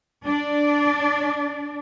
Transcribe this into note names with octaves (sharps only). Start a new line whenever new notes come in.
D4 D5